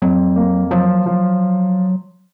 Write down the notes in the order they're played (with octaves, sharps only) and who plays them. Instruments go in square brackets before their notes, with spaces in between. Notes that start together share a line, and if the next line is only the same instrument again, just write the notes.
[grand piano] F2 [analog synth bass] F#3
[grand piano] A#3
[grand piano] F3 [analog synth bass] F#3
[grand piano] F3